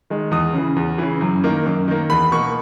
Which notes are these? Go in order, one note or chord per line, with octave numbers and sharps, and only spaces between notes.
D#3 G#3
E2 D#6
C#3 E3
E2
C#3 E3
F#2
D#3 A#3
F#2
D#3 A#3
E2 B5
B2 A#3 C#6